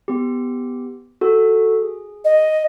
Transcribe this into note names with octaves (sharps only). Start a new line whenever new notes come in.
B3 G4
F#4 A4
G#4
D#5